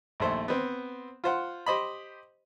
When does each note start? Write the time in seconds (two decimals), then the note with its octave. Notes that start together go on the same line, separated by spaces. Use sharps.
0.20 A#1 D#2 A3 C5
0.48 B3 C4
1.24 F4 C5 F#5
1.66 G4 C5 D#5 B5